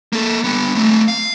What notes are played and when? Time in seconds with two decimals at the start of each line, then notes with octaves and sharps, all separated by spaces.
0.13 A#3 A4
0.44 G3 B3
0.75 A3 C4
1.08 F5